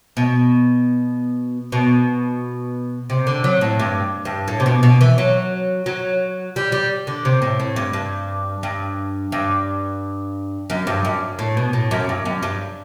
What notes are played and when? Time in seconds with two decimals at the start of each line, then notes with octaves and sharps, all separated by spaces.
0.17 B2
1.72 B2
3.10 C3
3.27 D3
3.44 F#3
3.61 A2
3.80 G2
4.25 G2
4.48 A2
4.60 C3
4.66 B2
4.83 B2
5.01 E3
5.18 F#3
5.86 F#3
6.56 G3
6.72 G3
7.07 D3
7.25 C3
7.42 A2
7.60 A2
7.76 G2
7.93 G2
8.63 G2
9.32 G2
10.70 F#2
10.87 G2
11.05 F#2
11.39 A2
11.57 B2
11.73 A2
11.91 F#2
12.09 G2
12.25 F#2
12.43 G2